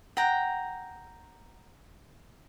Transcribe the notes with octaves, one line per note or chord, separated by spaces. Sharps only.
F#5 G5 A#5